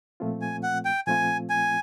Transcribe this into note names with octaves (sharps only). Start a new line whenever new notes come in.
A#2 F3 A3 C4 F4
G#5
F#5
G5
A#2 F3 A3 C4 F4 G#5
G#5